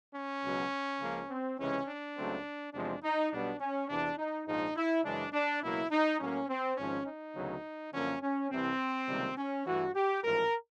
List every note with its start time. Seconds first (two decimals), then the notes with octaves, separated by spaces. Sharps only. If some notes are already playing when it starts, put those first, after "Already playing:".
0.15 C#4
0.43 C#2 B2 F#3
1.01 C#2 C#3 F3 A#3
1.29 C4
1.59 C#2 C3 E3 G#3 C#4
1.87 D4
2.17 C#2 C#3 F#3 A3 C4
2.74 E2 C3 F3 G#3 C4 D4
3.03 D#4
3.32 B1 B2 G3 B3 D4
3.60 C#4
3.89 E2 C3 E3 D4
4.18 D#4
4.47 A#1 G#2 F3 G#3 D#4
4.77 E4
5.04 F#2 C#3 E3 G#3 D4
5.33 D4
5.63 C#2 B2 F#3 A#3 E4
5.91 D#4
6.20 A2 F#3 A#3 C#4
6.49 C4
6.77 G#1 G#2 F3 C#4
7.07 D#4
7.36 D2 C#3 F#3 B3
7.93 F#2 D3 F3 A#3 C#4
8.22 C#4
8.50 C2 C3 E3 C4
9.08 C#2 C3 D#3 G3 A#3
9.37 C#4
9.66 G2 E3 A3 F#4
9.95 G4
10.23 A1 G#2 F3 A#4